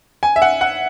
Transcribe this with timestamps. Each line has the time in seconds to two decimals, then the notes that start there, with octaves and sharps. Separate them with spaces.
0.23 G#5
0.36 E5
0.42 F#5
0.61 F#5